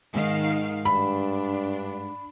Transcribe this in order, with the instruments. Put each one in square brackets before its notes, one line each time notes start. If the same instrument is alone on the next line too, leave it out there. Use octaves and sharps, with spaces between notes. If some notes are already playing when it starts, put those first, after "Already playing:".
[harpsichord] G#2 G#3 [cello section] D#3 F5
[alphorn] G2 [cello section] D4 [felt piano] B5